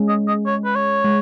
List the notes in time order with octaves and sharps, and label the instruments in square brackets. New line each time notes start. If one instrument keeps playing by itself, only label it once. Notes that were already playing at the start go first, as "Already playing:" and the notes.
Already playing: [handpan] G#3 C#4 G#4
[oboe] D#5
D#5
C#5
B4
C#5
[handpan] G#3